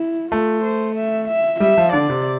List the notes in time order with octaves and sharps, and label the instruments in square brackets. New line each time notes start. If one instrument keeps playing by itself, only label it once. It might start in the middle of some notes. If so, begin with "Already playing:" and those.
Already playing: [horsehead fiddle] E4
[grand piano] A3 [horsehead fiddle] F4
[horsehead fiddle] C5
E5
E5
[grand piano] G3 [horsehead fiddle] E5
[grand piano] F3
[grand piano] D3 [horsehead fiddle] D5
[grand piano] C3